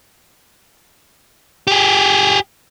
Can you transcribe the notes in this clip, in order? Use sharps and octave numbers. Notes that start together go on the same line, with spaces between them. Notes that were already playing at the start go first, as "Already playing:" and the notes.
G4 G#4